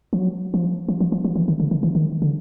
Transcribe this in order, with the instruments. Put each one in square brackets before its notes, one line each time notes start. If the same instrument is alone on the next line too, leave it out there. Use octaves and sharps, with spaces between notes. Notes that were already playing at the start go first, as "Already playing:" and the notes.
[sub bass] F3
F#3
F3
F3
F3
F3
F3
E3
D#3
D3
D#3
E3
D#3
D3